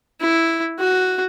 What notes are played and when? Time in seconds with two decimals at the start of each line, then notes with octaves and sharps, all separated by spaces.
0.21 E4
0.79 F#4